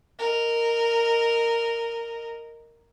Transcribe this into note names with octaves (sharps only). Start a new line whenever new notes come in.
A#4 D#5